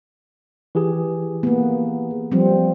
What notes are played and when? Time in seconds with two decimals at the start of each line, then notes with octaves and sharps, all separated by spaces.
0.75 E3 G4 G#4
1.43 A#3 B3
2.32 F3 G3 C4